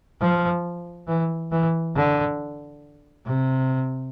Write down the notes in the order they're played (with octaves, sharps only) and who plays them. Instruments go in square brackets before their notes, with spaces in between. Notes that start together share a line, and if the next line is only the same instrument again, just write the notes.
[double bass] F3
E3
E3
D3
C3